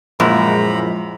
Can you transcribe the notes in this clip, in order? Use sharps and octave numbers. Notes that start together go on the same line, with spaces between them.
F#2 A#2 F3 G#3 E4 A#5 B5